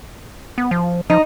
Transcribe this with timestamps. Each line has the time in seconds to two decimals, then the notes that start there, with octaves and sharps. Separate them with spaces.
0.58 B3
0.71 F3
1.10 F3 D#4